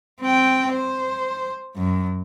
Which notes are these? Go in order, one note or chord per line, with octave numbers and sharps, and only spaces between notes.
C4 G5
C5
F#2